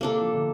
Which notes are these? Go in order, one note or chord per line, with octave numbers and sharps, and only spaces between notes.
C3 A#3 D4 A4
F3
D3